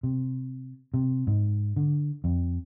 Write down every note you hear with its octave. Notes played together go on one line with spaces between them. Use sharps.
C3
C3
G#2
D3
F2